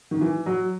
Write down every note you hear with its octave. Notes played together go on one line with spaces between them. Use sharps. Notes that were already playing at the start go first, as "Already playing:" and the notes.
D#3
E3
F#3